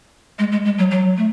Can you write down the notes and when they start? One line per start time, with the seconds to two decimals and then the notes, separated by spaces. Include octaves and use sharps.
0.39 G#3
0.52 G#3
0.65 G#3
0.78 F#3
0.91 F#3
1.17 A3